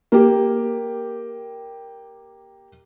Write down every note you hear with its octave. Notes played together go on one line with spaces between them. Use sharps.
A#3 G4